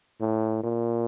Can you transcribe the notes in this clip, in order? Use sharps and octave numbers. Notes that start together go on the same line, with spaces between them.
A2
A#2